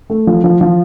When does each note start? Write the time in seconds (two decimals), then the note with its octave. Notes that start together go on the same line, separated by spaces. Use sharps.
0.10 A3
0.27 F3
0.44 F3
0.61 F3